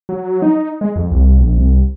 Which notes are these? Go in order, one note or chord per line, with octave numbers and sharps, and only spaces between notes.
F#3
D#4
G#3
F2
C2
A#1
C2